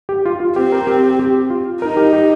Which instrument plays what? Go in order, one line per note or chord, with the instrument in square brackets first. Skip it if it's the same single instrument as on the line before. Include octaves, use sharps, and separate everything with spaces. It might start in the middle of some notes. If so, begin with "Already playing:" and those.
[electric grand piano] G4
F4
F4
[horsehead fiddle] C4 [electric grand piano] G4
[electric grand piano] A#4
G4
G4
G4
F4
[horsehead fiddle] D#4 [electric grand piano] A#4
[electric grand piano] G4
G4